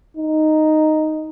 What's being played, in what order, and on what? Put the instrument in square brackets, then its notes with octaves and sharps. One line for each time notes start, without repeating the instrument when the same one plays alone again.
[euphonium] D#4